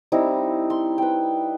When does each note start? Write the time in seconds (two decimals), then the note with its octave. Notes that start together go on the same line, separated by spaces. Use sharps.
0.12 G3 C4 D#4 E4
0.70 C6
0.98 B4 G5